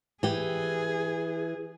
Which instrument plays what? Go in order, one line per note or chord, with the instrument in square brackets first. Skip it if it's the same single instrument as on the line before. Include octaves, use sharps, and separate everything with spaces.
[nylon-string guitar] E3 G4 [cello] G#4